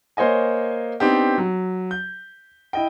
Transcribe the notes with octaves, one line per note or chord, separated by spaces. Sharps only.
A#3 C5 C#5 D#5 G#5
B3 C4 D4 D#4 G4
F#3
G6
E4 D#5 G5